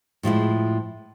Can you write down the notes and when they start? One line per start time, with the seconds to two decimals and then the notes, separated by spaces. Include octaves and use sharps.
0.23 A2 F3 G#3 E4